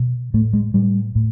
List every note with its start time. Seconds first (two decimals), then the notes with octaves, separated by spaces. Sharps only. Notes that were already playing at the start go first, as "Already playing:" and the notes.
Already playing: B2
0.34 A2 A3
0.53 G#3
0.74 A2 G3
1.15 A2